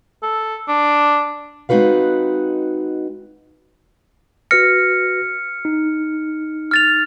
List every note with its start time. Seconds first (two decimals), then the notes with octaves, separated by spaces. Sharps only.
0.23 A4
0.68 D4
1.69 G#3 C4 D#4 F#4 B4 F5
4.51 F#4 B4 F6 A#6 C#7
5.65 D#4
6.71 F6 A6 F7